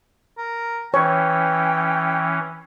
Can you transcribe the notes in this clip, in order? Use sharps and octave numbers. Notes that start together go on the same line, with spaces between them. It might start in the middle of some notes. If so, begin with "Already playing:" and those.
A#4
E3 C#4 C#5 G5